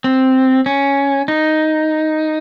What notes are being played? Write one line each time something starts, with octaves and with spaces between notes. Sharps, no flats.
C4
C#4
D#4